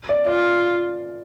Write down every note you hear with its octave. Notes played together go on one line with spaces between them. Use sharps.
D5
F4 D5